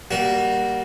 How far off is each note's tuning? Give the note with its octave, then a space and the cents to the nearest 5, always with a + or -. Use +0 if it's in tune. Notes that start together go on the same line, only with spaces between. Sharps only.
G3 -20 A#3 +0 F#4 +0